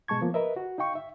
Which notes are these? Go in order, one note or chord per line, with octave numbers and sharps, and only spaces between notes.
B2 G#3 A5 C#6 G#6
F3 A#3 B3
A#4 B4 D#5 E5
F#4
D#4 F5 G5 C#6
E5